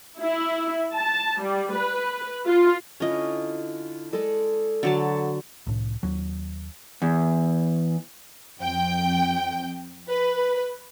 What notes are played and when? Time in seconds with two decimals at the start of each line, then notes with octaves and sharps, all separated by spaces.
0.20 E4
0.94 A5
1.42 G3
1.74 B4
2.46 F4
3.00 D3 C#4 E4 F4 D#5
4.13 G#3 A4 D5
4.83 D3 F#3 A5
5.67 C2 A2
6.03 D#2 F#3
7.02 E2
8.59 F2 G5
10.08 B4